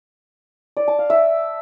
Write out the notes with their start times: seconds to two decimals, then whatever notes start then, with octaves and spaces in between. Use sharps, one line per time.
0.77 D5
0.88 A5
0.99 F5
1.10 E5